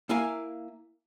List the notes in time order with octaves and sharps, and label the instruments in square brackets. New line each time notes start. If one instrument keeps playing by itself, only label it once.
[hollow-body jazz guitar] A#3 E4 F5 G#5